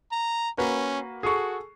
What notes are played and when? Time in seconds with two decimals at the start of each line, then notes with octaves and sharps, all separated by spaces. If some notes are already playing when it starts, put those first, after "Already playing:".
0.12 A#5
0.58 A#3 C#4 F#4 B4
1.23 F#4 G#4 A4 C#6